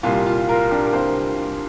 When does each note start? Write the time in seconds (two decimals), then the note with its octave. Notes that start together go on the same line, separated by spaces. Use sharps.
0.03 C2 A#2 G3 F4
0.26 F4
0.49 F4 A#4
0.71 D4 G4
0.84 A#4
0.93 C2 A#2 G3 G4 C5